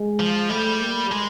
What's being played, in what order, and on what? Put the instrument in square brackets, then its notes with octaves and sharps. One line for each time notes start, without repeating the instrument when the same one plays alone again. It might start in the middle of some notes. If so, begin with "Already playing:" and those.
Already playing: [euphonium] G#3
[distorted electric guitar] F3
[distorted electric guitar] G3 [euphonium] A3
[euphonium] A#3
[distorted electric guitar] G#3